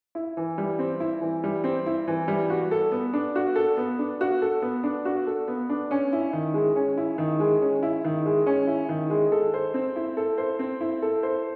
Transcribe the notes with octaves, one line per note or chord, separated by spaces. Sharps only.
E4
E3
G3
C4
E4
E3
G3
C4
E4
E3
G3
F#4
A4
B3
D4
F#4
A4
B3
D4
F#4
A4
B3
D4
F#4
A4
B3
D4
C#4
E4
D#3
G#3
C#4
E4
D#3
G#3
C#4
E4
D#3
G#3
C#4
E4
D#3
G#3
A4
C5
C4
E4
A4
C5
C4
E4
A4
C5